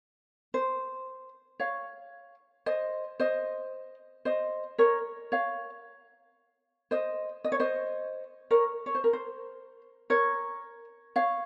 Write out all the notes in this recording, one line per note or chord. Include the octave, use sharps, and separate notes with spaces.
C5
C#5 F5
C5 D#5
C5 D#5
C5 D#5
A#4 C#5
C#5 F5
C5 D#5
D#5
C#5
C5 D#5
A#4 C#5
C#5
C5
A#4
C5
A#4 C#5
C#5 F5